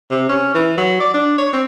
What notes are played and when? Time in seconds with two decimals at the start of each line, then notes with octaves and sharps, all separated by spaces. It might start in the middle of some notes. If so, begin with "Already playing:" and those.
0.11 C3
0.29 C#4
0.55 E3
0.78 F#3
1.00 D5
1.14 D4
1.38 C#5
1.53 C4